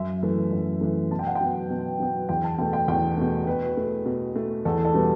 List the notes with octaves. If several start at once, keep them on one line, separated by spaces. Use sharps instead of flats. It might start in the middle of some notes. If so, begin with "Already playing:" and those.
Already playing: F#2 E5
E3 A3
F#2
E3 A3
B2 A5
G5
F#5
G5
F#3 B3
B2
F#3 B3
E2 G5
A5
B2 A3 G5
G5
E2 G5
B2 A3
B2 B4
A3
B2
A3
E2 A4
A4
B2 G3 B3